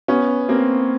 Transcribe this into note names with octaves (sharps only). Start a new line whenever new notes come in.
B3 C#4
A#3 C4